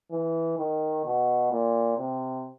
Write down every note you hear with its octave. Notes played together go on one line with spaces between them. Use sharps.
E3
D#3
B2
A#2
C3